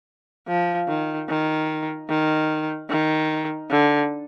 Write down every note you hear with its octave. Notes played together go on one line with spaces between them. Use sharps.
F3
D#3
D#3
D#3
D#3
D3